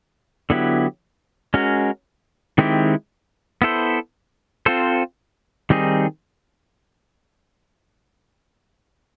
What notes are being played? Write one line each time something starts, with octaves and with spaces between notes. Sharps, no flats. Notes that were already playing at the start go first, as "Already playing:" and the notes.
D3 F#3 B3 E4 G4
G#3 C#4 F#4 A#4
D#3 G#3 C4 E4 G4
B3 E4 A4 C5
C4 F4 A4 C5
D#3 G3 C4 D#4 G#4